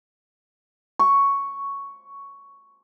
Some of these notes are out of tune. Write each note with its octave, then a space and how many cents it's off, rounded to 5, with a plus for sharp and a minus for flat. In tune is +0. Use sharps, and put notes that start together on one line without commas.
C#6 +5